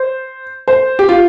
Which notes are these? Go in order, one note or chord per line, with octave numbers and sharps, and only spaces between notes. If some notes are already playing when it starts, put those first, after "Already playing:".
Already playing: C5
C5
G4
F4